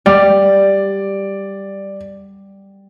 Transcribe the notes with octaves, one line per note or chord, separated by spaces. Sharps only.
G3 D5